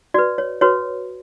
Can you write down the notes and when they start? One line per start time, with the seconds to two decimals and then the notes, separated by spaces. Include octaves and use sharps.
0.14 F#4 B4 D5
0.38 C#5
0.61 F#4 B4 C#5